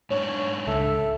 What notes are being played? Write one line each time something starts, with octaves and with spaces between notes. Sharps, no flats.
G#2 D4 C#5
C#2 A4 E5